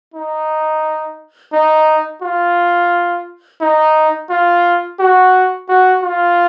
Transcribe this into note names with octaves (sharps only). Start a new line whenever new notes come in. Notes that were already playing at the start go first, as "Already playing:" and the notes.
D#4
D#4
F4
D#4
F4
F#4
F#4
F4